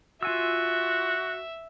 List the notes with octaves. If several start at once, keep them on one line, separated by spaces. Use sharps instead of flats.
F4 F#4 E5 G#5 E6